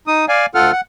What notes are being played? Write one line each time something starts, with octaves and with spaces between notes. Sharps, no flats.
D#4 D#6
D5 F5 G#5
D2 F4 A4 F#5 F6
F#5